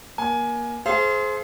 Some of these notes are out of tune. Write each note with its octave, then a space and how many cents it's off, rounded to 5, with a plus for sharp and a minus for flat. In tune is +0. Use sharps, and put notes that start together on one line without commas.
A#3 +25 G#5 +10
G#4 +35 C5 +0 F5 -40